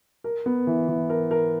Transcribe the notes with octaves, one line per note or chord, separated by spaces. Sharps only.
A#4
B3
E3
E3
A#4
A#4